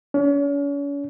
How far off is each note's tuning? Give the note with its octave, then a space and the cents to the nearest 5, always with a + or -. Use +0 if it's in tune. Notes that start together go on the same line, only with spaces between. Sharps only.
C#4 +40